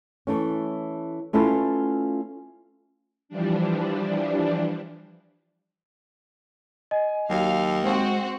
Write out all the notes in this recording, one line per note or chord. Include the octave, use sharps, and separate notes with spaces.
E3 A3 C#4
A3 C#4 E4 F4 A4 B4
E3 F3 G3 D4
D#5 G#5
D#2 F#3 F5
G#3 C4 F#4 C5